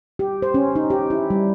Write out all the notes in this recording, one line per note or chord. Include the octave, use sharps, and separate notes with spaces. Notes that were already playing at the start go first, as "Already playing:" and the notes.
G4
C5
C#4
D#4
G4
E4
G3